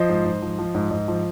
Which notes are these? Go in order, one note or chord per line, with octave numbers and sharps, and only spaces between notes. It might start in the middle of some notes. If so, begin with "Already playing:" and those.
Already playing: F3 C5 D#5
G#2
G#2
F3
F3
G#2
G#2
F3